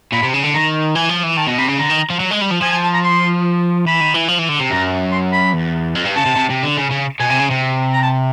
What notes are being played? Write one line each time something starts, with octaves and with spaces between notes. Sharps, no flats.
A#2 B5
C3
C#3
D3
D#3 A#5
E3 G#5
F3
E3
D#3 A5
B2
C3 B5
C#3
D3 A#5
D#3
F3
F#3
G#3
G3
F3
F3 G#5
G#5
A5
A#5
C6
E3 B5
D#3
E3
F3
E3
D3
C3
F#2 A#5
C6
B5
E2
F2
G2
C#3 A5
C3
C3
C3
D3
C#3
C#3
B2 G#5
C3
C#3
C3
A#5
A5